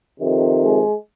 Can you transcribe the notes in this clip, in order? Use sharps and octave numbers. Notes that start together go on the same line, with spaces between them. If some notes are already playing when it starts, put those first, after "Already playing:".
F2 C3 D#3
G#3